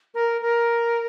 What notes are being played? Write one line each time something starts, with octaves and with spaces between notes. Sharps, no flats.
A#4
A#4